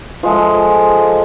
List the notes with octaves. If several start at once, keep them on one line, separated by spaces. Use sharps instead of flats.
F3 G#3 A4